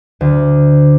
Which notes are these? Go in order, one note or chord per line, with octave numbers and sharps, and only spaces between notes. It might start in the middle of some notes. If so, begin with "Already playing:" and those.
D2